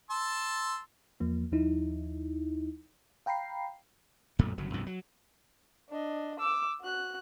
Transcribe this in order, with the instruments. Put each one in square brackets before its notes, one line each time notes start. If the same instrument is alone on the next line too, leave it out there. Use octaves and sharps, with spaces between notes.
[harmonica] A5 C6 E6
[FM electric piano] E2 F3 A#3
D#2 F3 D#4 E4
F5 G5 A#5 B5 C7
[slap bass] B1 F#2 A#2 A3
G1 C#3 F#3
C2 G2 B2 F3
F#3
[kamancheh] D4 D#5
D6 E6
F#4 F#6